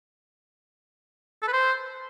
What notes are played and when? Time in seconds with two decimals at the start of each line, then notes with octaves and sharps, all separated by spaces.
1.42 A4
1.48 B4
1.53 C5